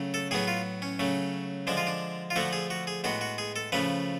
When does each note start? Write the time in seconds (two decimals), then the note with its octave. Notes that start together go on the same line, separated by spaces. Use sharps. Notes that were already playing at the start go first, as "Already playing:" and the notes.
Already playing: C#3 F#3 A3
0.14 A4
0.31 A2 F#3 B3 G#4
0.48 F4
0.82 C#4
0.99 C#3 F#3 A3
1.67 D3 F3 G#3 D4
1.77 F4
1.87 D4
2.30 F4
2.36 D3 F3 A3 F#4
2.53 G#4
2.70 F#4
2.87 G#4
3.04 A2 G#3 B3 F#4
3.21 F#4
3.38 G#4
3.56 A4
3.72 C#3 F3 A3 B4